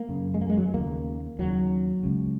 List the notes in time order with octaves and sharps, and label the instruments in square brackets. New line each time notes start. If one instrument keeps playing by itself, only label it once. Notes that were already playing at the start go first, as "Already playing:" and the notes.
Already playing: [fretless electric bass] A#3
F#2 C#3
G#3
A#3
G#3
F#3
D#2 C#3 A#3
D#2 C#3 F#3
C#2 C#3